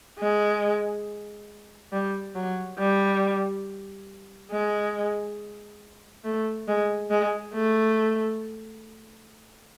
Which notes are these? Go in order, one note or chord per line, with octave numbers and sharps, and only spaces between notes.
G#3
G3
F#3
G3
G#3
A3
G#3
G#3
A3